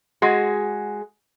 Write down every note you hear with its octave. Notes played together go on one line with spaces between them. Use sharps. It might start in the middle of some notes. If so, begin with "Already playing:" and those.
G#3 F#4 G#4